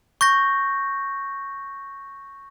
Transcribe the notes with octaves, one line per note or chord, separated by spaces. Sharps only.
C#6 G6 A#6